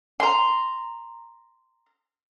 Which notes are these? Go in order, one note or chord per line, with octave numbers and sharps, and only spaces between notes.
A#5 C6